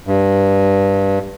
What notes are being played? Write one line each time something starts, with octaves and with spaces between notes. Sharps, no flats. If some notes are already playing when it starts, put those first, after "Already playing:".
G2